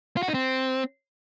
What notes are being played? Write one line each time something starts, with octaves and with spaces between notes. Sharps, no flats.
F4
F#4
D#4
C4